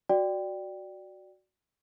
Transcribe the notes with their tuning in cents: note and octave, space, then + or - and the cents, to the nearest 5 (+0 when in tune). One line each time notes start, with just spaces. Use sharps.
F#4 +0 D5 +0 G5 +0